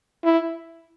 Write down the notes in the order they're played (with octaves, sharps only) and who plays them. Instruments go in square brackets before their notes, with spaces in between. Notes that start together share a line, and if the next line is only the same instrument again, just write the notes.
[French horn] E4